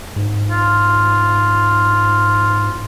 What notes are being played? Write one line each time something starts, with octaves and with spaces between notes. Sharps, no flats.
G#2
F4